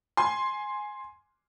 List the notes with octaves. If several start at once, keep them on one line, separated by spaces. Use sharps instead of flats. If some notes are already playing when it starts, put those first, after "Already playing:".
G#5 C6